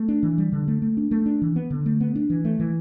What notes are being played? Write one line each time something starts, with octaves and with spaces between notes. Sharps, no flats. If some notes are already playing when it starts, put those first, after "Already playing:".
Already playing: A3
D4
E3
G3
D3
A3
A3
D4
A3
D4
E3
B3
D3
A3
B3
D4
E3
A3
E3